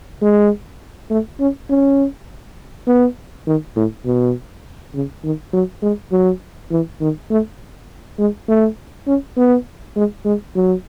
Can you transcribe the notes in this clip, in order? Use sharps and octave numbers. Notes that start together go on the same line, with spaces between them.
G#3
A3
C#4
C#4
B3
D#3
A2
B2
C#3
D#3
F#3
G#3
F#3
E3
D#3
A3
G#3
A3
C#4
B3
G#3
G#3
F#3